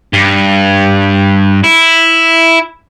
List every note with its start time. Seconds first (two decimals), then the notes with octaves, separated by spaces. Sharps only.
0.13 G2
1.64 E4